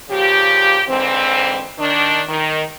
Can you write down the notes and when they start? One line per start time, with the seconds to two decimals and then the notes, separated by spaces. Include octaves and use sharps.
0.10 A#2 C#3 F3 G4
0.88 G#2 D3 E3 C4
1.78 D#3 D4
2.28 D#3